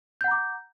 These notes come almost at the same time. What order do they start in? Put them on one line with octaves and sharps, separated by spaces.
G6 F#5 A#5 D6